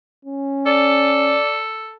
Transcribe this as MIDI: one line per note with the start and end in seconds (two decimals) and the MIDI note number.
0.25 1.38 61
0.66 1.95 69
0.66 1.59 74